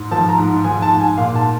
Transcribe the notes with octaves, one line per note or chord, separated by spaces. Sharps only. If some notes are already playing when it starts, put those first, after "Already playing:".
Already playing: G#2
F3 A5
A#5
G#2
F3 G#5
A5
G#2
G#5
A#2 F5
A5